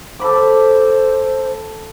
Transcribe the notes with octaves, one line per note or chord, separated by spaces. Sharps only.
A4 C5 B5 D6